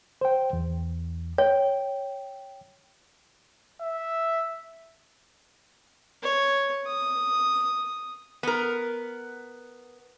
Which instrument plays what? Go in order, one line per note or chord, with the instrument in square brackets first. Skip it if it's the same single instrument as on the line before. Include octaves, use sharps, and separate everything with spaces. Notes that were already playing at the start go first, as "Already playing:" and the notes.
[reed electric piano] C5 G5
E2
[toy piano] C#5 [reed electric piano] G5
[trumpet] E5
[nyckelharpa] C#5
D#6
[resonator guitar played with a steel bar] B3 A#4